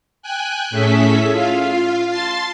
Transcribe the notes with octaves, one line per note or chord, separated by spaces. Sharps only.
G5 G#5 F#6
A2 C#4 G#4 A4 E5 B6
F4 F5
A5 C6 A6 C7